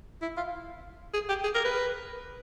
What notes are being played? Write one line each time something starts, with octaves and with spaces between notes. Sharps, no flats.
E4
F4
G#4
G4
G#4
A#4
B4